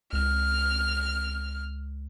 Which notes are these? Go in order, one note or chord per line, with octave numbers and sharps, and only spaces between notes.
C#2 F6